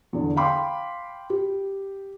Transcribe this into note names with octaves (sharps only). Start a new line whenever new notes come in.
E2 D3
F5 G5 B5 C6 D6
G4